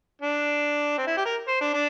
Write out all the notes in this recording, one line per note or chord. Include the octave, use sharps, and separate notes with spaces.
D4
C4
E4
G4
A#4
C5
D4
D4